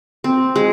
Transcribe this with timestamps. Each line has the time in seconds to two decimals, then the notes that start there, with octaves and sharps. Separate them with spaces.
0.24 C4
0.56 G#3